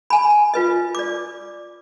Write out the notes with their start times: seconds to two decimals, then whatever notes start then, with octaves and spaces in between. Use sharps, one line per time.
0.10 G#5 B5
0.54 F4 B4 D#5
0.95 D5 D6